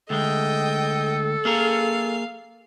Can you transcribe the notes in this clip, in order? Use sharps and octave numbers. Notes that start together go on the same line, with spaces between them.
D2 G#3 A4 D#5 G5
A#3 G#4 A#4 F5